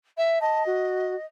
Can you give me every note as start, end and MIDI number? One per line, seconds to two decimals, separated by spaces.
0.17 0.39 76
0.41 1.25 75
0.41 0.63 81
0.66 1.16 66